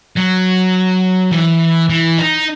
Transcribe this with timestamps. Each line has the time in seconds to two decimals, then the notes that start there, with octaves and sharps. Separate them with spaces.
0.16 F#3
1.32 E3
1.90 E3
2.18 D#4